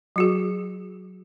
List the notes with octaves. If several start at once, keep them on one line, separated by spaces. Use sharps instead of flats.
F#3 F#4 G#4